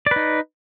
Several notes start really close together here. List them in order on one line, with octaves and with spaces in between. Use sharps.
D5 B4 D#4